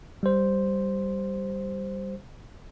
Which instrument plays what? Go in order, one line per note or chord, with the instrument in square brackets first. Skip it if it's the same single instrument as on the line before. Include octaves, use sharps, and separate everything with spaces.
[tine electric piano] G3 C5